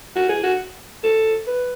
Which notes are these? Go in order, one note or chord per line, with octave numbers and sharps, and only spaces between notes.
F#4
G#4
F#4
A4
B4